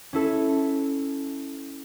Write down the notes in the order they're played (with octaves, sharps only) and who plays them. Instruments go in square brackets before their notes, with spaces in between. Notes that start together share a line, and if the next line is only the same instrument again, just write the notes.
[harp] C#4 E4 A4